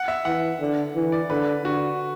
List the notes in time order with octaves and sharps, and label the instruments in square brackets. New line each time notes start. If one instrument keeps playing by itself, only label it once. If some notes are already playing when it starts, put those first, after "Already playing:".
Already playing: [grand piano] F#5
E5
[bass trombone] E3 [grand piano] F#5
[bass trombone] D3
E3
[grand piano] D5
[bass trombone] D3 [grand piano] B4
[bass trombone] D3 [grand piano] F#4